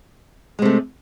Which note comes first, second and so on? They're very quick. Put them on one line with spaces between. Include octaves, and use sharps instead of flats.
G#3 C3 A3